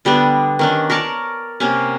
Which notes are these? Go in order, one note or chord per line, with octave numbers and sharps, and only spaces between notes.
D3 G3 B3 D4
D#3 C#4 D4
A#4 C#5 D5 A5
C3 A#3 C#4